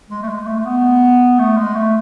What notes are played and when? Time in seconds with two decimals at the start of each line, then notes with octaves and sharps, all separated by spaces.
0.10 G#3
0.23 A3
0.29 G#3
0.47 A3
0.57 A3
0.65 B3
1.39 A3
1.57 G#3
1.75 A3